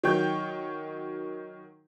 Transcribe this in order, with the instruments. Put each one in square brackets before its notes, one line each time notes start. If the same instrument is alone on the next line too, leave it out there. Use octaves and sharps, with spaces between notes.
[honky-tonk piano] D#3 F#3 C#5 G5 G6